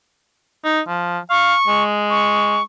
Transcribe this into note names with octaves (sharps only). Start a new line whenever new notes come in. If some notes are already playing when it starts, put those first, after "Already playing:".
D#4
F3
F5 C#6
G#3
C#6